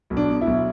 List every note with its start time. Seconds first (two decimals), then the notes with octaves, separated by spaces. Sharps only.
0.10 B1
0.17 D4
0.29 B2
0.41 E4
0.47 B1